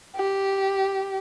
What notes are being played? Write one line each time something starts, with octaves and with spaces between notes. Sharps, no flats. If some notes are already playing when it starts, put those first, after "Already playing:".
G4